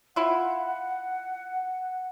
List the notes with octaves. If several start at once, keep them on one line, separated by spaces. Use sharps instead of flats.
E4 F4 F#5